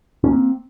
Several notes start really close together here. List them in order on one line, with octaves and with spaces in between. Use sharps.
C#4 A#3 C4